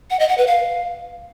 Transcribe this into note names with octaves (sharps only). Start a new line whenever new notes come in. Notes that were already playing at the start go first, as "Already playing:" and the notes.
F#5
D#5
F#5
B4
F5